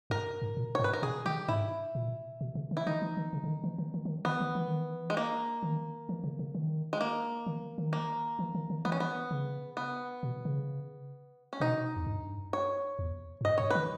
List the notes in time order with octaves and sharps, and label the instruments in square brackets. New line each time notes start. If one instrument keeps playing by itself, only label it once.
[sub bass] G2 [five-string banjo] A#4
[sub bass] G#2
A#2
[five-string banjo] C#5
[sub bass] G#2
[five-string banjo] B4
A#4
[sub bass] B2 [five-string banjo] G#4
[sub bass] D#3 [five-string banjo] G4
[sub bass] G#2 [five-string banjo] E4
[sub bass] A#2
B2
C#3
D#3
[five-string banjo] E4
[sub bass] D#3 [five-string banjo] D#4
[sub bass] E3
D#3
C#3
C#3
D#3
E3
D#3
D#3
E3
D#3
[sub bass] D#3 [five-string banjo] B3
[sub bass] D#3
E3
D#3
E3
[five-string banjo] G#3
A#3
[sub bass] D#3
E3
C#3
C#3
D#3
[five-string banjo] G#3
A#3
[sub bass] D#3
D#3
[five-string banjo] A#3
[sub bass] E3
D#3
D#3
[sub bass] E3 [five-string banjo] B3
[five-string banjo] C#4
B3
[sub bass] C#3
[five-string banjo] B3
[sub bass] B2
C#3
[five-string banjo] C#4
[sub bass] B2 [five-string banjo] D#4
[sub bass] E2
G2
[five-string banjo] C#5
[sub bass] E2
G#2
[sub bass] G2 [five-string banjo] D#5
[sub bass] G2 [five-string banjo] C#5
[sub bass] D#3 [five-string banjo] B4